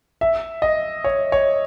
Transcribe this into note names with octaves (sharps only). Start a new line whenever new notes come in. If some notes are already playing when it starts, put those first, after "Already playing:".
E5
D#5
C#5
C#5